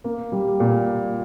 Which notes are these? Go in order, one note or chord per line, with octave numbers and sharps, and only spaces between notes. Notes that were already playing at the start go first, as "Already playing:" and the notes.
A#3
G3
A#2